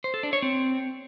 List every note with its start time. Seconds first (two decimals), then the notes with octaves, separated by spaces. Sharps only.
0.04 C5
0.14 A4
0.23 D4
0.33 C#5
0.42 C4